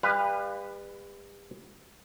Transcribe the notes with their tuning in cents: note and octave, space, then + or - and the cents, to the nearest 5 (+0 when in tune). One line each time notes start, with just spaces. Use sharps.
G3 +40 B4 +0 F5 +0